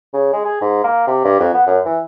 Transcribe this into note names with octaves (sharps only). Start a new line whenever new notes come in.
C#3
G#3
G#4
G#2
A#3
C3
G2
F2
B3
F#2
E3